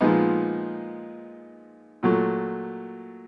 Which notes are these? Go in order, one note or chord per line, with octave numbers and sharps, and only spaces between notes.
A#2 F3 G#3 B3 D#4
A#2 F#3 A3